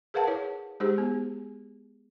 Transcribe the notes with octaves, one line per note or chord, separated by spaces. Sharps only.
G#4 A#4 B4 F5 F#5 A5
E4 C#5
G#3 D#4 G4 G#4 C5
B3